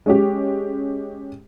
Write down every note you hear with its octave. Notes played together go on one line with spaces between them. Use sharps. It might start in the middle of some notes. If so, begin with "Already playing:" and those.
G#3 C#4 G4